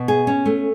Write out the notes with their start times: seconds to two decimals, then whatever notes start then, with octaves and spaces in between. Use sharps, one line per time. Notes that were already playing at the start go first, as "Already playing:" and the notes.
Already playing: B2
0.08 G#4
0.27 C#4
0.46 A3